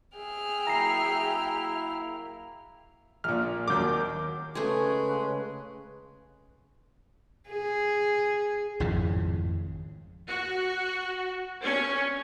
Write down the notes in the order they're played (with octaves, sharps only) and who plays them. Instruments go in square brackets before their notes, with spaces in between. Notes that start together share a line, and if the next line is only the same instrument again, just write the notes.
[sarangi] G#4 [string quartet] E5 G5 F6
[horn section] F#3 A#3 E4 [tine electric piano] A#5 C7
[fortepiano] A#1 A#2 [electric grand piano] F6
[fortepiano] D#2 F#3 A#4 [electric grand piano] D6 G6
[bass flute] C#3 [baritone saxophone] G#3 [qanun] A3 G#4 [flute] B4
[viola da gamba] G#4
[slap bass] G#1 F2 A2 C#3
[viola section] F#4
C#4